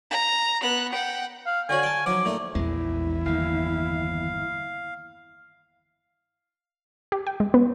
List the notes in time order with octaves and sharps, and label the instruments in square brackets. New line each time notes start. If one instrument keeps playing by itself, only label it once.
[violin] A#5
B3 F#6
F#5 G5
[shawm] F5
[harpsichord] D3 F#4 C#5 [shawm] G#5
[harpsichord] G5 A5
[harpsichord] F3 F#3 D#4 [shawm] D6
[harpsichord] A#2 A3 D#4
[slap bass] A#1 G#3 [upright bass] E2 [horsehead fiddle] E4
[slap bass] G1 D#3 A#3 [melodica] F5
[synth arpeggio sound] G4
G5
G#3
B3